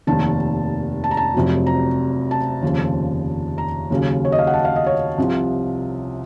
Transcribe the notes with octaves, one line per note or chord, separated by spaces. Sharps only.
F1 D#2 D#3 A5
A5
A#5
A5
F1 F2 C3 F#3
A#5
A5
F1 D#2 C#3 F3
A#5
D#2 C#3 F#3
C#5
D#5
F5
F#5
A5
F5
D#5
C#5
C2 C3 F3